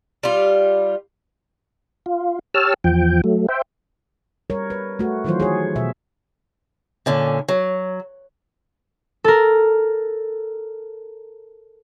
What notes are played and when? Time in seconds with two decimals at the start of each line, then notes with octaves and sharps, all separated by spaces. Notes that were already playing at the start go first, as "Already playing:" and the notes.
0.23 G3 F4
2.06 F4
2.54 G4 C#5 A5 E6 F6
2.84 E2 F3 G5
3.24 F#3 A3
3.48 C5 E5 G5
4.50 G3 A#4 C#5
4.70 B4
4.99 A3 F#4
5.24 D#3 E3 F#3 F4 C5
5.40 G#4 C#5
5.76 B2 E5
7.06 A#2 D3 C#4
7.48 F#3
9.24 A4 A#4